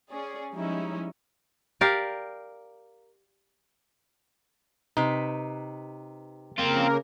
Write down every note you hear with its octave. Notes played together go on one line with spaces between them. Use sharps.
C#4 G#4 D5
F3 G3 G#3 C#4 D#4 E4
G4 A#4 D5 F5
C3 D#4 B4
C#3 A#3 C4 F4 A#4